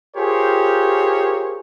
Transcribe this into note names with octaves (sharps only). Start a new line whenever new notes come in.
F4 G4 G#4 A#4 C5 C#5